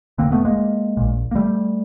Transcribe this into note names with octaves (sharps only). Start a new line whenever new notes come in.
E1 D#2 D3 A#3 C4
A3 B3
G#3 A#3
A#1 A#2
A#3
G3 A3